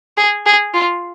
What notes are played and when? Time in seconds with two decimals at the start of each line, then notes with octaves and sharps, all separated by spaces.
0.17 G#4
0.46 G#4
0.74 F4